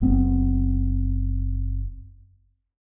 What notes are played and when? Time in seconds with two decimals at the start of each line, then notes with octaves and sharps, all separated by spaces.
0.01 F#1 B3 C4